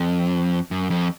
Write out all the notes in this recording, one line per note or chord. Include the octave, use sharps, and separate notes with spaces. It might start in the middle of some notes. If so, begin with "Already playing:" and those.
Already playing: F2
F#2
F2